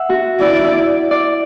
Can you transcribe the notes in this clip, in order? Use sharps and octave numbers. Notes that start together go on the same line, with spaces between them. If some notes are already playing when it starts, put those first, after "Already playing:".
Already playing: E5 F#5
F#4
E4 D5
E4
D5